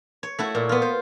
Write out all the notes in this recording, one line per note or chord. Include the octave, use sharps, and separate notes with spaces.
C#5
A3 E4 F#4
A#2
B3 F4
C5